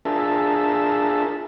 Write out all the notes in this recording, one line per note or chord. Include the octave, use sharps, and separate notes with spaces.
D4 F4 G#4 A#4 E5 A5